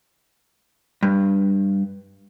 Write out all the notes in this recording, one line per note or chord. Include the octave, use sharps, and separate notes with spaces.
G2